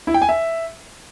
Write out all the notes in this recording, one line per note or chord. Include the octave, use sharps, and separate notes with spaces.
E4
G5
G#5
E5